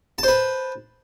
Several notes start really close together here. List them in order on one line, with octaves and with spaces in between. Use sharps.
A5 C5 B4